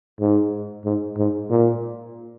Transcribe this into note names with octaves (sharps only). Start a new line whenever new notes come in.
G#2
G#2
G#2
A#2